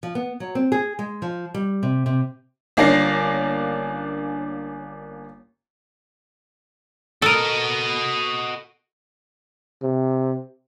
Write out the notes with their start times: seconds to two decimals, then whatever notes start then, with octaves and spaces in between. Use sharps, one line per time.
0.03 F3
0.15 B3
0.40 F#3
0.55 C4
0.72 G#4
0.99 G#3
1.22 F3
1.54 G3
1.83 C3
2.06 C3
2.77 G1 A#3 C#4 D4 A#6 C7
7.22 F#4 A4 A#4 D#5
9.82 C3